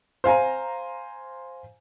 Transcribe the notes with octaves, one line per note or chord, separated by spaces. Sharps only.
C5 F5 G#5 A#5